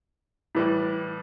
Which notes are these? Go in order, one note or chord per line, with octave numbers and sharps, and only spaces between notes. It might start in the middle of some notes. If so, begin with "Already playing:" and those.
A2 E3 G3